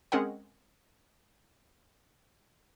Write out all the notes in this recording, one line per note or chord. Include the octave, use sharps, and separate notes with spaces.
G#3 C4 C#4 G#4 A#4 F#5